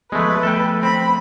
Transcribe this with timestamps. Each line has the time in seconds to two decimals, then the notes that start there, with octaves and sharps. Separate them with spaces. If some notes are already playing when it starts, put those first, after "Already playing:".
0.12 F3 G#3 A3 B3 B4
0.43 A3 A4 G5
0.83 C4 B5